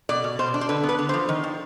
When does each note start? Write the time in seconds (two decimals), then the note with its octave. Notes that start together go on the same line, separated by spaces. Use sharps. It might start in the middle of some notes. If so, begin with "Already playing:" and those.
0.09 B2 D5
0.24 B2
0.39 B2 C5
0.54 D4
0.61 C5
0.69 D3 B4
0.83 B3
0.89 B4
0.99 D3
1.09 F3 C5
1.29 D#3
1.43 D#3